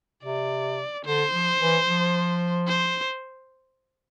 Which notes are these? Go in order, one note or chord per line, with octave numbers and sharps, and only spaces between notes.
C3 D5
D3 C5
F3
E3
F3
C5